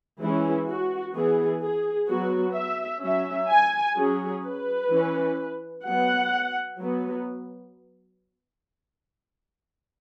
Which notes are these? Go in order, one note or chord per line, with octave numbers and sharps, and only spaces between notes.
E3 G#3 C#4 E4
F#4
E3 B3 G#4
G#4
F#3 B3 F#4
E5
F#3 C#4 E5
G#5
F#3 C#4 G#4
B4
E3 C#4
F#3 B3 F#5
F#3 B3